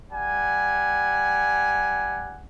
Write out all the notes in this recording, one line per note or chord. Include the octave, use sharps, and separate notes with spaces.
G3 F#5 G#5